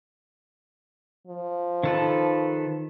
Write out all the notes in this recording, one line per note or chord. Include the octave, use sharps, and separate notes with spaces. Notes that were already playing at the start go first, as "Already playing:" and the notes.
F3
D#3 A4 B4